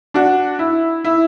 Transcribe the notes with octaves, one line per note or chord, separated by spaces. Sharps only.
D4 F#4
E4
E4